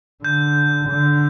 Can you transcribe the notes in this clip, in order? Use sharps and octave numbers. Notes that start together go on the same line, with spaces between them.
D3 G6
D3